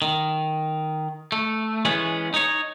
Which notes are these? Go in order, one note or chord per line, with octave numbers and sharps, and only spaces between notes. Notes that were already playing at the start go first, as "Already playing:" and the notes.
D#3
A3
E3 G#3 B3 C#4
D#4 C#5